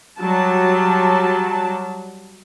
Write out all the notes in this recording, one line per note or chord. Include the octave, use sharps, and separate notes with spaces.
F#3 G3 A5